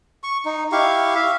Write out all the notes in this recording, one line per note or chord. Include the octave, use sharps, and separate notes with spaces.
C#6
D#4
E4 G4 F5 C#6
E5 F5